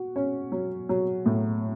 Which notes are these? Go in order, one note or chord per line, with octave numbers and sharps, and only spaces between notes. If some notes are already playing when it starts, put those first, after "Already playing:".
Already playing: F#4
C#4
F#3
F#3
A2